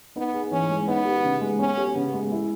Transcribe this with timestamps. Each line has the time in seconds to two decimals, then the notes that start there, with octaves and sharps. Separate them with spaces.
0.16 B3 D#4
0.34 G#4
0.51 E3 C#4
0.69 G#3
0.88 B3 D#4
1.05 G4
1.24 C#3
1.41 G#3
1.59 B3 C#4
1.77 G4
1.95 C#3 B3
2.14 G#3
2.32 E4